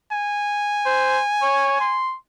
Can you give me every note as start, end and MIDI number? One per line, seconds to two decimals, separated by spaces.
0.12 2.01 80
0.86 1.19 72
1.42 1.78 73
1.80 2.14 84